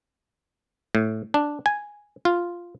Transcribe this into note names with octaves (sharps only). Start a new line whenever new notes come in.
A2
D4
G#5
F4